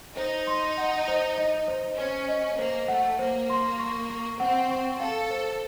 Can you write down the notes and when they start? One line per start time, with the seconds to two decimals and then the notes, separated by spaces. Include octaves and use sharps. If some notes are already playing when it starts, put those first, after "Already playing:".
0.17 D#4 C5
0.47 C6
0.77 F#5
1.08 C5
1.38 D#5
1.68 C5
1.98 C#4 C5
2.28 D#5
2.58 A#3 C5
2.88 A3 F#5
3.19 A#3 C5
3.50 C6
3.80 C#6
4.10 C#6
4.39 C4 F#5
4.71 C#6
5.00 A4 F5
5.30 C5